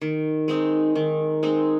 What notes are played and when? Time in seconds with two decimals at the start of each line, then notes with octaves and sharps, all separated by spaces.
0.02 D#3
0.48 G#3 C4 D#4
0.95 D#3
1.43 G#3 C4 D#4